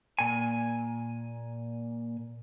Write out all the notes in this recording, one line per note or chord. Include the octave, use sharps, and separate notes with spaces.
A#2 G#5